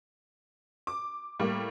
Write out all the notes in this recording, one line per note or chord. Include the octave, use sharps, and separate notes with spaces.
D6
A2 G3 A#3